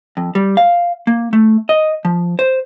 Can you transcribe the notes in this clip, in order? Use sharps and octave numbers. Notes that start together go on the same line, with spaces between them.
F2
G3
F5
A#3
A3
D#5
F3
C5